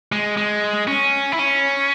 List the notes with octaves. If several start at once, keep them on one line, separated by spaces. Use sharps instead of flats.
G#3
G#3
C#4
E4
C#4